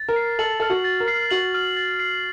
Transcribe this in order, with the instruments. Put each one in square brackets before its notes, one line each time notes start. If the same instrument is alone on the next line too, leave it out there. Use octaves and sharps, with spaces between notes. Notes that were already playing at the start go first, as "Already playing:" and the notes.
Already playing: [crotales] A6
[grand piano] A#4
[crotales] C7
[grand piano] A4 [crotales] F#7
[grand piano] A4 [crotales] F6
[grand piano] F#4
[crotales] A6
[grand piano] A#4
[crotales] C7
[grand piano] F#4 [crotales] F#7
[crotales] F6
A6
C7